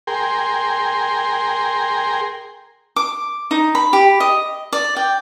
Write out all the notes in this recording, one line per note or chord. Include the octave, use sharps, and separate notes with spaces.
G#4 A#4 G5 C6
D6
D#4
B5
G4
D#5
D5
G5